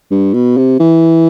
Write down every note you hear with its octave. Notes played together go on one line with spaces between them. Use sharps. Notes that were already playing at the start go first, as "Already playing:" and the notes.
G2
B2
C3
E3